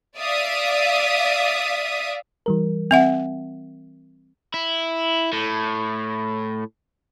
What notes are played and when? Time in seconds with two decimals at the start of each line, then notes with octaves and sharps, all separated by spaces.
0.18 D5 E5 F5 D#6
2.46 E3 G3 A#4
2.91 C4 E5 F#5
4.54 E4
5.33 A2